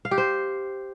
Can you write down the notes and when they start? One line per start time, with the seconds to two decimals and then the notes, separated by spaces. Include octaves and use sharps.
0.05 F5
0.11 G4
0.18 C5